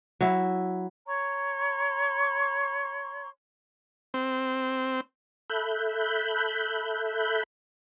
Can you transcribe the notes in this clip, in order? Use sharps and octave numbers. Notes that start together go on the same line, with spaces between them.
F#3 E4
C#5 A#5 C6 C#6
C4
A4 E5 B5 F#6 G6